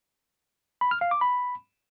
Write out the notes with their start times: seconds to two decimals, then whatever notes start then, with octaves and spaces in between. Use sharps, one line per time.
0.81 B5
0.91 F6
1.01 F5
1.11 D6
1.21 B5